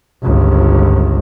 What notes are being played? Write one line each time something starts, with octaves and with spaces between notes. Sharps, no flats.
G1 C#2